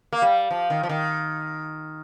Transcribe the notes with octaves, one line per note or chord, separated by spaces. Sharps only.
A#3
G3
F3
D#3
F3
D#3